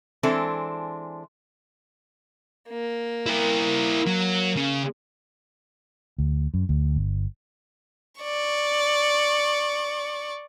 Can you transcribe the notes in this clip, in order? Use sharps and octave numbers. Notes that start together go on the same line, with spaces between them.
E3 G#3 C4 D4 A4
A#3
E4 A#4
F#3
C#3
D2
F#2
D2
G1
D5 C#6